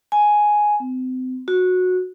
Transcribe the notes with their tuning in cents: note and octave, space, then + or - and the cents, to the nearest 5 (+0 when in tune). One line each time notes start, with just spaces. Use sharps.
G#5 +5
C4 -35
F#4 -15